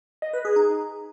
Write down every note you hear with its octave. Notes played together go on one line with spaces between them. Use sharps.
D#5
B4
G#4
D#4